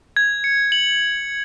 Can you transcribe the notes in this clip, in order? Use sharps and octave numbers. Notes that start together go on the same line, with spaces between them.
G#6
C#7
F#7